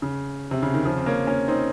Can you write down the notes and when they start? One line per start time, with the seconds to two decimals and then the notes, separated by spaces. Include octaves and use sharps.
0.02 C#3
0.51 C3
0.62 C#3
0.74 D#3
0.85 C#3 F3
0.98 C4
1.06 A#3 C#4
1.27 A#3 C#4
1.48 C4 D#4